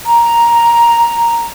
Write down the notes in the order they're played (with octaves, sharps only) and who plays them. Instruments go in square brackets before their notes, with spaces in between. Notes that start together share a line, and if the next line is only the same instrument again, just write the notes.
[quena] A#5